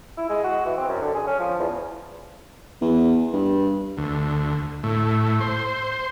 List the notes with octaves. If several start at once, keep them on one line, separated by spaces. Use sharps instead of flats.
E4
G#3
F#4
E3
C4
F#2
D3
G#4
C#4
F3
E2
E2
G2
D2
A2
C5